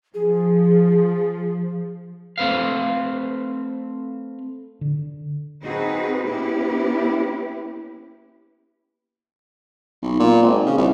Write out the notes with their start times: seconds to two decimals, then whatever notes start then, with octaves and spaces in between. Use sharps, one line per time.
0.14 F3 G#4
2.38 A3 C4 B4 F5
4.81 D3
5.63 C4 D#4 F#4 G#4 B4
6.26 A#3 B3 C#4 E4 G4 B4
10.02 B1
10.19 A#2
10.42 G#1
10.66 C#3
10.78 C2